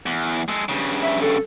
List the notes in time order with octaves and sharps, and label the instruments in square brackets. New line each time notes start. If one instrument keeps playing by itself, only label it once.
[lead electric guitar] E2
G#3 A4
G2 C#3
[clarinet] E5
A4